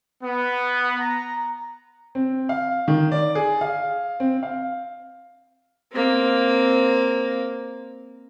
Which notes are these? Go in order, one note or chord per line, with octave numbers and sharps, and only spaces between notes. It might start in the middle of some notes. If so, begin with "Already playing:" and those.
B3
A#5
C4
F5
D#3
D5
G#4
F5
C4
F5
A#3 C4